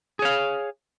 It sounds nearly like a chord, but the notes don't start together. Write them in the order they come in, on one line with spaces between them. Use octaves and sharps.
G#4 C#5 F5